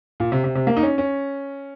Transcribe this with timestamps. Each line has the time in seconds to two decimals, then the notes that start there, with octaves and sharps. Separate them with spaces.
0.20 A#2
0.32 C3
0.44 C3
0.55 C3
0.67 A#3
0.77 D#4
0.83 C#4
0.98 C#4